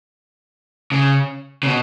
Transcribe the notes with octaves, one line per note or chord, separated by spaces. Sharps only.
C#3
C#3
B2